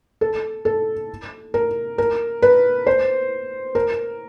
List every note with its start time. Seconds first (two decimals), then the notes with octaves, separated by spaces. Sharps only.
0.21 A4
0.65 A4
1.54 A#4
1.98 A#4
2.42 B4
2.87 C5
3.75 A#4